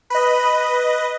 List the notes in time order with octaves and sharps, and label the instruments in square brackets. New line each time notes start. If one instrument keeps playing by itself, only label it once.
[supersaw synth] B4 D#5 [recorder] B5